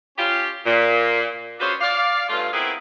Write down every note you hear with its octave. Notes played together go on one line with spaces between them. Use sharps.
C#4 F4 G4
A#2
C#4 D4 F4 F#4 B4 C5
D5 F5
G2 A3 C#4 F4
B3 C4 E4 G#4 A#4 B4